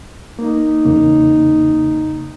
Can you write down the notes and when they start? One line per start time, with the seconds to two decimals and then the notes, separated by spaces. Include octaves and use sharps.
0.39 A#3 D#4
0.85 E2 C#3 A#3